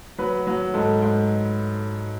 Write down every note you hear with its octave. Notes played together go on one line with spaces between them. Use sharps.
F#3 B4
F#3
G#2 A4
G#2